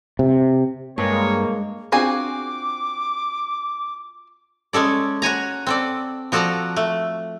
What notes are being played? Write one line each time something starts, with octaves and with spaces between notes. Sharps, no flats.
C3
G2 G#3 A#3 C#5
C4 D4 F4 F#4 G#4 G#5 D6
G#3 C#4 A4 D5
F#4 C#5 G#5 A#5
C4 A4 D5
F3 F#4 A4 D5 A5 A#5
A3